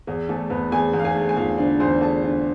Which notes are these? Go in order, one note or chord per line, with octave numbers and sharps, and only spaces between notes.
E2 G#4
E2 A3 A4
E2 B3 B4
E2 G#4 G#5
E2
F5
G#4 G#5
A3
G#5
E2 F4 F5
D3 D4 D5
E2 C5 C6
E2 A4 A5
D3